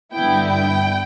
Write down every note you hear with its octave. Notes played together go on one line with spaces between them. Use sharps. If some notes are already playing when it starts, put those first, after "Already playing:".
G2 D3 B3 E4 G5
G5